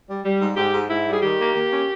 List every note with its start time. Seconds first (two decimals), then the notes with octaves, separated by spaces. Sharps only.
0.08 G3
0.24 G3
0.41 G#2
0.57 G#2 G4
0.73 G#2
0.90 G#2 E4
1.06 G3
1.13 G#4
1.22 D#3 G4
1.39 A#3
1.55 A#3
1.71 C#4